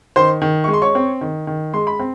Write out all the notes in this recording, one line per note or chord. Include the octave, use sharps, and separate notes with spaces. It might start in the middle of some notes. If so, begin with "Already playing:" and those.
D#3 C5 C6
D#3
C#6
G#3
C6
C#5 C#6
C4
D#3
D#3
G#3 C6
B5
C4